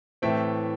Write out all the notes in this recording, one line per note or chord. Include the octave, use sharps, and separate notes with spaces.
A2 E3 A3 C4 E5 G5